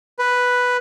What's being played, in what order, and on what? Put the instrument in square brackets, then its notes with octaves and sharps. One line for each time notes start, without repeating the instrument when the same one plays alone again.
[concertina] B4